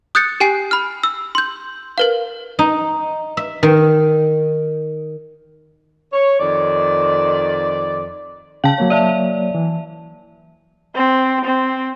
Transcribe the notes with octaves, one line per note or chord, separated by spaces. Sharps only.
D#6 F#6 G6 A6 C#7
G4 G5 G#5 C7
B5 F6
E6
C6 G6
A#4 B4 F5
D#4
E5
D#3
C#5
F2 D#3 D5
C#3 C#4 F5 G5 A5
F#3 A#3 C#5
D5 E5 A5
E3
C4
C4